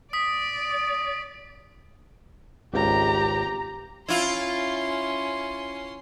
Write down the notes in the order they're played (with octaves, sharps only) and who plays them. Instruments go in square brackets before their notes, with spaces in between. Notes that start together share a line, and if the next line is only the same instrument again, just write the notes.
[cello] D5 [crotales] D#6 B6
[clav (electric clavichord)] G#1 C#2 [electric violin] G4 A#5
[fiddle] C#4 C6 [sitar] E4 F4